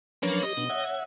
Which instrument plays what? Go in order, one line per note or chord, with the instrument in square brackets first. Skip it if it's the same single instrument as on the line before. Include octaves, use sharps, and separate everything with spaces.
[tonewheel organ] F3 F#3 D4 [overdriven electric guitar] A#3 [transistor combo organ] C#4 B4 C#5
[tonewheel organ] G4 [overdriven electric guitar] D#5
[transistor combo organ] B2 [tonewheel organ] D4
[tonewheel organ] C#5 [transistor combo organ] E5 F#5